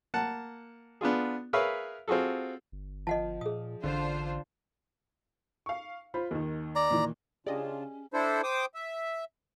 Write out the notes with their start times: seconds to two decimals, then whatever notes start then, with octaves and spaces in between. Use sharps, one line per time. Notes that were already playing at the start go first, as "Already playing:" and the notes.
0.14 A#3 F#5 A5
1.01 B3 D4 F4 G#4
1.53 G#4 A#4 B4 C#5 E5 F5
2.08 C4 F4 F#4 G#4 A4
2.72 G1
3.07 F3 D#5 F#5 A5
3.41 A#2 G#4 D#6
3.83 A1 D3 D4 F4 C5
5.66 F5 C#6
6.14 F4 C5 B5
6.31 D#2 D#3
6.75 D5 A#5
6.91 A#2 D#3 E3
7.47 C#3 C#4 D4 F4 G4 G#4 D5 D#5
8.13 D4 E4 A4 C5
8.43 C5 G5 D6 D#6
8.74 E5